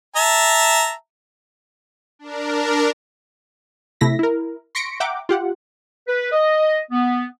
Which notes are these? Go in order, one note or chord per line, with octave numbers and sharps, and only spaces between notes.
E5 A5 A#5
D4 A#4
C3 A3 E4 A#6 B6
E4 A#4
C6 C#6 A#6 B6 C#7 D7
E5 F#5 G5 A#5 D6
F4 G4 F#5
B4
D#5
B3